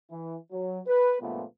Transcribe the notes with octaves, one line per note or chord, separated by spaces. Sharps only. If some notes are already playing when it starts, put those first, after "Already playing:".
E3
F#3
B4
C#2 G2 A#2 F3 A3 B3